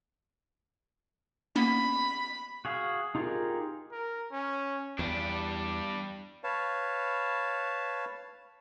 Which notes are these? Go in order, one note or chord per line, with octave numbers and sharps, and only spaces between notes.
A#3 B3 C#4 B5
F#4 G#4 F5
D#4 F4 G4 G#4 A#4
A#4
C#4
E2 G3 D4
B4 C#5 F5 A5